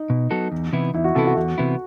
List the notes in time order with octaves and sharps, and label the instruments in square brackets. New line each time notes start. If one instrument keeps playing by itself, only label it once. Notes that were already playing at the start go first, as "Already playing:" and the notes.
Already playing: [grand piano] D#4
[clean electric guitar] B2
F#3 B3 F#4 A4
E2
C3 E3 B3 E4
[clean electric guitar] E2 [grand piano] E4
[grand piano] F#4
[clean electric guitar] C3 E3 B3 E4 [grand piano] A4
[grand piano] F#4
[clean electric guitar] E2 [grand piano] F#4
[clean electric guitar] C3 E3 B3 E4